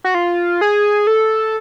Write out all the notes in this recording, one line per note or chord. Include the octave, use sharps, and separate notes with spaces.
F#4
F4
G#4
A4